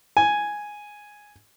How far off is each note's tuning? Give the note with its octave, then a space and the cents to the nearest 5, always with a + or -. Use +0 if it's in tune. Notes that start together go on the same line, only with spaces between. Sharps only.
G#5 +0